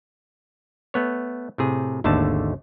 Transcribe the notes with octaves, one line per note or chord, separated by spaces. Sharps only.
A3 B3 C#5
A2 C3 G#4
G#1 D#2 D3 A3 A5